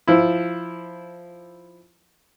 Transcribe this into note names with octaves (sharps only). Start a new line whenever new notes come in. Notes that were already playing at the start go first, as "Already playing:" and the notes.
F3 E4